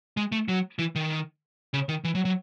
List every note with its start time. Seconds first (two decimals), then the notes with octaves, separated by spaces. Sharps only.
0.17 G#3
0.32 A3
0.48 F#3
0.79 E3
0.95 D#3
1.74 C#3
1.89 D#3
2.04 E3
2.15 F#3
2.25 F#3